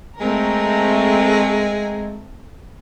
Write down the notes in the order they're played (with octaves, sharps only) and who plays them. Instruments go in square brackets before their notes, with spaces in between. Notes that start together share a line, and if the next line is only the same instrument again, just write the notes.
[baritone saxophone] G#3 [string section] A3 C4 A#4